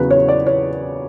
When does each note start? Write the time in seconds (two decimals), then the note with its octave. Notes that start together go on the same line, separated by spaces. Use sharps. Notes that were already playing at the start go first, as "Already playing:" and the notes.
Already playing: E2 C#3 F#3 B4
0.11 C#5
0.29 D5
0.47 C#5